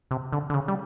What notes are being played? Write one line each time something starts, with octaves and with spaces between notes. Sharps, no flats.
C3
D3
D3
C#3
G3